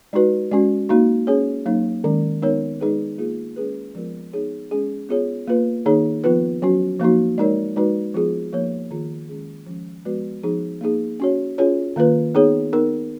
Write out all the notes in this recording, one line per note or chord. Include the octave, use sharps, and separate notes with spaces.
G#3 D#4 F#4 B4
G#3 C#4 F#4
A#3 D#4 F#4
C#4 G#4 C#5
F#3 A#3 D#4
D#3 G#3 C#4
G#3 B3 D#4 A#4 C#5
G#3 D#4 G#4 B4
A#3 F4 G#4
G#3 C#4 G#4 B4
F3 G#3 B3 F4 A#4
B3 D#4 G#4 C#5
G#3 C#4 G#4
B3 F4 G#4 C#5
A#3 F4 B4
D#3 A#3 D#4 G#4 C#5
F3 B3 F4 B4
F#3 C#4 F#4
F3 A#3 D#4 F#4
G#3 D#4 A#4 C#5
G#3 D#4 F#4 B4
F3 B3 F4 G#4
F3 A#3 D#4 A#4 C#5
D#3 A#3 F4 G#4
D#3 G#3 C#4 G#4
F3 G#3 C#4
F3 G#3 B3 F#4 B4
F3 B3 D#4 G#4
A#3 D#4 G#4
C#4 F#4 C#5
C#4 F4 G#4 C#5
D#3 A#3 F4 B4
B3 D#4 G#4 C#5
B3 D#4 A#4